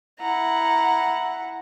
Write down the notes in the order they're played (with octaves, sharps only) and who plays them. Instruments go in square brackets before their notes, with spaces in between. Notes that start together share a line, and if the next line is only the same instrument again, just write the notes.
[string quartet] E4 F#5 A#5